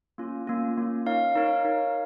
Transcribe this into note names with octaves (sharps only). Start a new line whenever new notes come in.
A#3 C#4 F4
A#3 C#4 F4
A#3 C#4 F4
D#4 A#4 C#5 F5
D#4 A#4 C#5 F5
D#4 A#4 C#5 F5